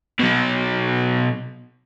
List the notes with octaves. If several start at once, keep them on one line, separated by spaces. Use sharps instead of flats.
B2 F#3